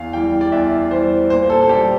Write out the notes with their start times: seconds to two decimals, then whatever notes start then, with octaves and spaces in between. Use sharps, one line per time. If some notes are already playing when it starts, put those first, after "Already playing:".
Already playing: E2 F5
0.13 E3 G3 G5
0.41 D5
0.52 E2 E5
0.91 E3 G3 C5
1.30 A#2 C5
1.50 A4
1.61 A4
1.69 G3 G4